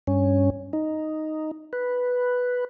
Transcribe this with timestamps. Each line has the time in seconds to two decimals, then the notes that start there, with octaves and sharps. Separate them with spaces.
0.07 G2 C#4
0.73 D#4
1.73 B4